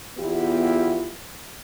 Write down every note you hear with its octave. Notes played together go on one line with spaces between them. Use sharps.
E2 B3 E4 F4 G4 B4